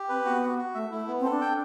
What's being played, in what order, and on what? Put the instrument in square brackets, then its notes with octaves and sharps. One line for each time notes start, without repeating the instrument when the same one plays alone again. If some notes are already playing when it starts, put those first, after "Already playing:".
Already playing: [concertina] G4
[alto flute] C4 [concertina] B4
[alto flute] B3 [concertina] F#4
[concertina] F#4
F#4
[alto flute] A3 [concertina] E5
[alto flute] A3 [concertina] E4
[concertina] B3
[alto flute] C4
[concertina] A4
[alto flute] D4
[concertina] G5